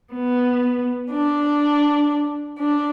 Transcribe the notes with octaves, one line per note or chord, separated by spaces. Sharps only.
B3
D4
D4